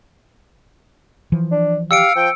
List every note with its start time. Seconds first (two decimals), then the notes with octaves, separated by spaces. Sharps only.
1.32 E3 F3
1.51 D4
1.91 G4 F5 E6 C#7 D7
2.16 F3 G5